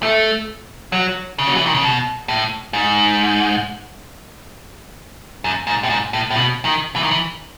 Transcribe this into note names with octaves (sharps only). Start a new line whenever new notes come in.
A3
F#3
C#3
F#3
E3
D#3
C#3
B2
A2
G#2
F#2
G#2
A2
G#2
A2
A2
B2
D#3
E3
D#3
E3